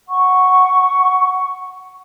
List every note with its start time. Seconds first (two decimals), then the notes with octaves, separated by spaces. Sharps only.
0.07 F#5 C#6